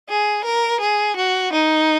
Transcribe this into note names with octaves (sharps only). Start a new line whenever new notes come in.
G#4
A#4
G#4
F#4
D#4